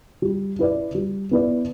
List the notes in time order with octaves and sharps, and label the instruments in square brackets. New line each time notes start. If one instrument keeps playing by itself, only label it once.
[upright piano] G3
E4 B4 D5
G3
B3 E4 B4 D5